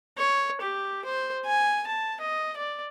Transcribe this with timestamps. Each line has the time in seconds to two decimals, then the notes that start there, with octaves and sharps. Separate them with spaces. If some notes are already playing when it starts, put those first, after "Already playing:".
0.18 C#5
0.61 G4
1.05 C5
1.45 G#5
1.87 A5
2.21 D#5
2.57 D5